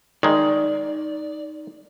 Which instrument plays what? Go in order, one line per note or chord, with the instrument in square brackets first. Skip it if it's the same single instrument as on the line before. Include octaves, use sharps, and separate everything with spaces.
[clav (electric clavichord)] D#3 G#3 [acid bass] D#4 [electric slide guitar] D5